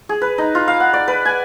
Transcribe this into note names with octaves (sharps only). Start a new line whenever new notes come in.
G#4
B4
D#4
F4
F5
F#5
D5
B4
G#5